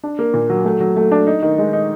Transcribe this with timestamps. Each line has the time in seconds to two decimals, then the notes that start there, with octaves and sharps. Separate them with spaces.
0.03 D4
0.19 A#3
0.34 A#2
0.50 F#3
0.65 A3
0.80 F#3
0.96 A3
1.12 D4
1.27 D#4
1.42 D#3
1.58 G#3
1.73 D#4